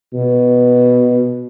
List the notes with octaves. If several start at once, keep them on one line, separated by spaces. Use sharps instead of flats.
B2